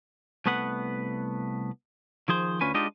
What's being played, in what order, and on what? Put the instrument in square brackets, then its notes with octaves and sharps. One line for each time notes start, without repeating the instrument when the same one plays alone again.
[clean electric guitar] C2 A3 B3 B4 F#5
D#3 F3 G#4 C5
D2 C#4 F4 B4 G#5
G#3 D4 D#4 F4 G4 D#5